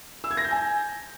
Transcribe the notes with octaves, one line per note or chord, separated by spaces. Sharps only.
E6
G#6
A#6
G6
G#5